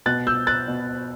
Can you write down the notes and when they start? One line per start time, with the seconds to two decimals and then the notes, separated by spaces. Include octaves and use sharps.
0.06 B2 F#6 A6
0.27 E6 G6
0.47 F#6 A6
0.68 B2